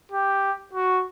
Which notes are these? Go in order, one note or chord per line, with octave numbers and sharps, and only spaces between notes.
G4
F#4